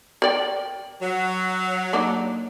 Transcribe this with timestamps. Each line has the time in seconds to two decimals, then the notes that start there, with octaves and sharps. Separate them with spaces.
0.22 A#4 D5 G5
1.02 F#3
1.93 A#3 D4 D#4